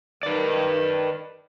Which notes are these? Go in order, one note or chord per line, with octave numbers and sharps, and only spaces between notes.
D#3 B4 D5